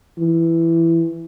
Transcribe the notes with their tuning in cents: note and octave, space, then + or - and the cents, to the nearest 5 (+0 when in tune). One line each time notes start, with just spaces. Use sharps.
E3 +10